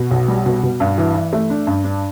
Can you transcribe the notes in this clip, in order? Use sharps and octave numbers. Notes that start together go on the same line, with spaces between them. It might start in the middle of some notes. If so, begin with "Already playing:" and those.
Already playing: B2
B1
G3
B2
B2
G2
E3
E3
A3
D4
G2
D4